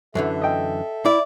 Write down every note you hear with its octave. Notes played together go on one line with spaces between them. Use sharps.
F#2 D3 E3 A4 E5
D#5 G5
E4 D5